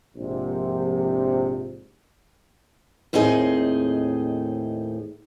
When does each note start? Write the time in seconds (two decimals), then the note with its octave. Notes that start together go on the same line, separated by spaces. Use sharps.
0.17 A#1 G#2 C3
3.13 D#2 A2 C4 D#4 G#4 D#5